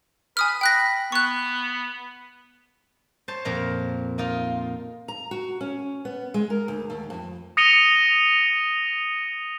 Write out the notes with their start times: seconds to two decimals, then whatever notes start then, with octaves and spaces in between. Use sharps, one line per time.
0.37 B4 G#5 D#6 F6
0.61 G5 B5 F#6 A#6
1.12 B3 C#6 F#6
3.28 C5 C#5 A5
3.45 F2 A#2 A#4
4.18 A#3 D#4 F4
5.08 A#5
5.31 F#4
5.61 C#4
6.05 B3
6.34 G#3
6.50 A#4
6.68 D2
6.90 D#2
7.10 F2
7.57 D#6 A#6 C#7 D#7 F7 G7